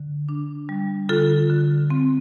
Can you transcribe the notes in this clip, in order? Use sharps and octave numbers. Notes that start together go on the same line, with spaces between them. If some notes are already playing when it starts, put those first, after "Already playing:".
Already playing: D3
D4
G3
D3 F4 A4
D3
C4